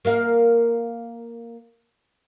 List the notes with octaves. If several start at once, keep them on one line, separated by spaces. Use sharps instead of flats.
A#3 A#4 F5